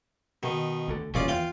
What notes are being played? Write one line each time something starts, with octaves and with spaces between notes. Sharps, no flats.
B2 D#3
D2 D3
D#1 A#2 E3 C#4 F4 D5
E2 F4 F5 G5